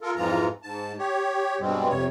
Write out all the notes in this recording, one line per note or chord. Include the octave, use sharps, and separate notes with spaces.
F4 A4 A#4
F2 G#2 E3 F3 F4 A#5
G#2 A5
G4 C#5
G2 B2 G3 G#3 C4
F2 C3 C#5